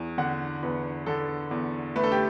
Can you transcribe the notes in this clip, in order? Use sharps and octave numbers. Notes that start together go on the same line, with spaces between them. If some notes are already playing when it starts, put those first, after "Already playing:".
Already playing: E2
D3 F#5
E2 B4
D3 A4
E2
A3 B4
A4
G4